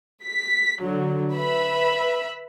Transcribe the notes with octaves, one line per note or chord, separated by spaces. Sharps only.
B6
D3 F#3
B4 E5 B5